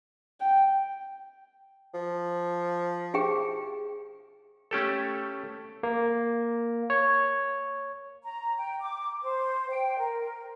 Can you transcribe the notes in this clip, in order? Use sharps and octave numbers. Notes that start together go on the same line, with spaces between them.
G5
F3
G4 G#4 G5
A3 C#4 G4 A4
A#3
C#5
A#5
G5
D6
C5
G5
A#4